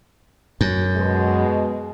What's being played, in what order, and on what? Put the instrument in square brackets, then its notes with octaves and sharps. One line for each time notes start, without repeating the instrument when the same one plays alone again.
[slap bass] F#2
[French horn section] B2 G#3